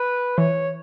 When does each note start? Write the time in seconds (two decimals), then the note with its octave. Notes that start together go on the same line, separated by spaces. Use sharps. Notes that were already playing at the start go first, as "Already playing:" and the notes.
Already playing: B4
0.38 E3 C#5